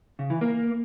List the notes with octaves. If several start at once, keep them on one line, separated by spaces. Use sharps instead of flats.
C#3
E3
A#3